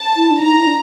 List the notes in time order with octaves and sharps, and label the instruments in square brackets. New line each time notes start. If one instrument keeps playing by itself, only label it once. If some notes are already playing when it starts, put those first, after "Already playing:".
Already playing: [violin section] A5
[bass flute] E4
D4
[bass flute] D#4 [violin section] A#5
[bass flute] E4
D4